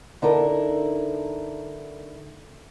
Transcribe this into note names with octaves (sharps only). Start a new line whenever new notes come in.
D3 D#4 E4 A4 A#4